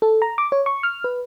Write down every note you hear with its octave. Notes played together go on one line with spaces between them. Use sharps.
A4
A#5
D6
C#5
C#6
F6
B4